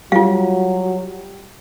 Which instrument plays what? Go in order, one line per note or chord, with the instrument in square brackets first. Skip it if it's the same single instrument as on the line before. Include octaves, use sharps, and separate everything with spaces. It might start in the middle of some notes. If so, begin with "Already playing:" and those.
[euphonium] F#3 [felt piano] G3 [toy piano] F4 F5